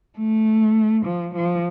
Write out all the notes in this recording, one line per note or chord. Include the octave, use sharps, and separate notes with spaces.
A3
F3
F3